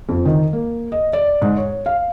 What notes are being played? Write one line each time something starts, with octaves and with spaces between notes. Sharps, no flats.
F2
D#3
A#3
D#5
D5
G#2
C#5
F5